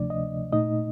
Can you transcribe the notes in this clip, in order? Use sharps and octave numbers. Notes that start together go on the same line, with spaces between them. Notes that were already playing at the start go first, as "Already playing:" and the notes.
Already playing: D2 C3 F3 A3 D4 D5
D#5
A#2 A3 D#4 D#5